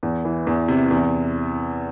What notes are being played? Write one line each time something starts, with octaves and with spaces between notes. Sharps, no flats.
E2
E3
E2
C3
E2